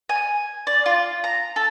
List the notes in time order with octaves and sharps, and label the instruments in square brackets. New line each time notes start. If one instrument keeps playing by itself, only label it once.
[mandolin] G#5
D5
F4
A#5
A4